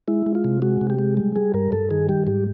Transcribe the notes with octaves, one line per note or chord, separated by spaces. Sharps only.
G#3 E4
G#3
F4
C3
G#3 F#4
C3
G4
G#3
G3
G3 G#4
G2 A#4
G2 A4
D#3 G#4
G3 G4
G#2 G4